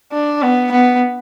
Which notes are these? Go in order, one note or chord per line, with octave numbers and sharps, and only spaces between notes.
D4
B3
B3